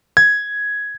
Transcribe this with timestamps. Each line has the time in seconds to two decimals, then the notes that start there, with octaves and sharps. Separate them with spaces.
0.17 G#6